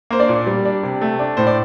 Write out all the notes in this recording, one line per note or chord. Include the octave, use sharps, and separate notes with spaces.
A#3 C5
D4 D5
A#2
G3
D4
C3
A3
D4
A2 C5
D5